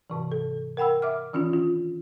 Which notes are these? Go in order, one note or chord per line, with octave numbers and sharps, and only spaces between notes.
G#2 C3 E3
A4
A#4 F#5 G5 B5 E6
E5 D6 F6
D#3 E3 C#4 D4 F4
F4